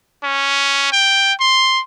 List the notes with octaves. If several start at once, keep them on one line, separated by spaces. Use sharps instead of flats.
C#4
G5
C6